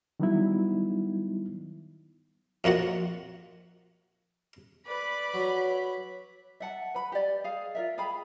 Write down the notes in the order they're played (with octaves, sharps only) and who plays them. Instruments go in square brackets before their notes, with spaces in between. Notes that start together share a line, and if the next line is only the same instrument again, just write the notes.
[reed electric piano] D#3 F#3 G3 B3 D#4 E4
[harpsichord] F2 A#3 F4 F#4 F#5
[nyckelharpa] B4 D5 [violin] B5
[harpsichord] F#3 [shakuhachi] C#5
[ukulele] E5 F#5 A5
B4 B5
G4 D5
G#4 F5
F4 A#4 E5
G#4 F5 G5 B5